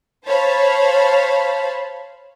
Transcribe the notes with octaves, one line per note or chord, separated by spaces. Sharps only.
C5 C#5 F5 A5 B5